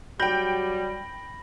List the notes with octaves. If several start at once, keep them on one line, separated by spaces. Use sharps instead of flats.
F#3 G3 G5 B5 G6 A#6 F#7